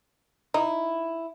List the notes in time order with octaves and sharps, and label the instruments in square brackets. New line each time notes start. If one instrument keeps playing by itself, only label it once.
[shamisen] D#4 [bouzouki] E4